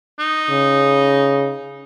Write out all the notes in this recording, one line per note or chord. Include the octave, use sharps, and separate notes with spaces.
D#4
C#3